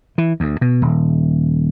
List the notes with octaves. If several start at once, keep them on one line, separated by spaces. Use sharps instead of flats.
E3
D2
B2
D#1